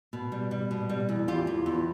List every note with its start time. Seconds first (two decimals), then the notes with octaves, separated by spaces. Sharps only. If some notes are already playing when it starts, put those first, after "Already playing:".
0.13 B2
0.32 G3
0.51 G3
0.71 B2
0.89 G3
1.09 E2
1.28 E2 F4 G4
1.47 E2
1.66 E2